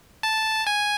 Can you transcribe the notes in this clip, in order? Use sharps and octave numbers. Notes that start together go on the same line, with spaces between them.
A5
G#5